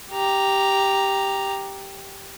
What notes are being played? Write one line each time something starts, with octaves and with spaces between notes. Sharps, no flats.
G4 A#5